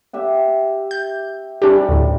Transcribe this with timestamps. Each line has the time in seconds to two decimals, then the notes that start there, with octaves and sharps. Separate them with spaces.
0.13 G4 E5 F#5
0.91 G6
1.62 C3 G3 C#4 D4 G4
1.89 D2 A2